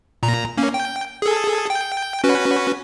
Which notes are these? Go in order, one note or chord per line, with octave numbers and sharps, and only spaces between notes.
A#2 A#5
A#3 C#4
G5
G#4 A4
G5
C#4 F#4 B4